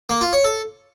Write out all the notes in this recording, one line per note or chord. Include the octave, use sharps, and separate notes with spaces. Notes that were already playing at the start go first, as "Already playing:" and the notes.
A#3
F4
C#5
A4